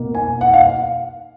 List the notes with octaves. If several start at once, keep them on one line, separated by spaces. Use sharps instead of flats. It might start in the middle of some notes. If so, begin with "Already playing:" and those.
Already playing: B2 A#3
G#5
F#5
F5